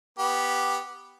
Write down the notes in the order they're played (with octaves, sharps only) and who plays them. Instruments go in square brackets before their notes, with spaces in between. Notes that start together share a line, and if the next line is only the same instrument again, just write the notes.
[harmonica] B3 G4